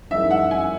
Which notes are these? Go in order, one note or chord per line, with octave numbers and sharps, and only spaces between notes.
F#2 E3 G#3 D#4 E5
F#5
G#5